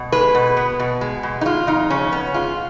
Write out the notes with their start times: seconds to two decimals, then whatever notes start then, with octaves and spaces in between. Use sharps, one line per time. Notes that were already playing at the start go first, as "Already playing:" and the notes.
Already playing: B2
0.12 G#3 B4
0.35 B2
0.57 B3
0.80 B2
1.01 G#3
1.23 B2
1.41 D#4
1.45 G#3 F4
1.67 F2 D#4
1.90 C#3 C#4
2.12 B3 C#4
2.34 G#3 F4